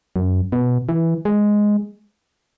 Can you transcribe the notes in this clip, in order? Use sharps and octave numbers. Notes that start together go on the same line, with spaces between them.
F#2
B2
E3
G#3